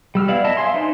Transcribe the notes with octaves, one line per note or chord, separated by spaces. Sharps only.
G3 E6 F6
B3 E4 D5 F5
E4 D#5 E5 A5
E5 F5 G#5 C6
D4 D#4 C5